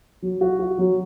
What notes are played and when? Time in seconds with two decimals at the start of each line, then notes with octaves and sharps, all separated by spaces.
0.22 F#3
0.41 F#4
0.59 F#4
0.78 F#3